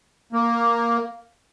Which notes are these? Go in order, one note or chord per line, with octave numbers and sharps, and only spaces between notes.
A#3